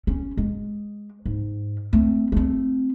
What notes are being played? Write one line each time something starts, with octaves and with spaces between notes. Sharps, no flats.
C#4
G#3
G#2
A3 C4
A3 C4